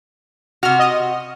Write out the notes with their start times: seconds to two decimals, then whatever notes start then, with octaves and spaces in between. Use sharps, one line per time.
0.63 C3 F#4 F6
0.79 D#5